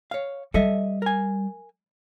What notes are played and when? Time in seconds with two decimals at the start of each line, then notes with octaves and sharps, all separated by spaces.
0.11 C#5 F5
0.54 G3 A4 D#5 E5
1.02 A#4 G#5